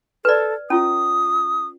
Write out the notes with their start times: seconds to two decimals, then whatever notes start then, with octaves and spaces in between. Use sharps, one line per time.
0.25 A4 B4 D5
0.70 C#4 F4 D#6